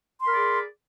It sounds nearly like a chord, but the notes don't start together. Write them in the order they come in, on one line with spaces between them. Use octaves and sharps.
C6 B5 A#4 D5 G#4